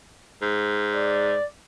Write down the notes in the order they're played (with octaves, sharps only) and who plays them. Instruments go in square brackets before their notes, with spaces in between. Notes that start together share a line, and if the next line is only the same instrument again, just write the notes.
[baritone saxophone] G#2
[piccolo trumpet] D5